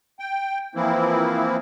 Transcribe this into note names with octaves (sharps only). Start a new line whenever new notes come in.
G5
E3 F3 A#3 C4 E4